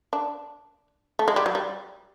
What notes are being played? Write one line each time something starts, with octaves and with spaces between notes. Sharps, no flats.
D4
A3
G#3
G3
F#3
G3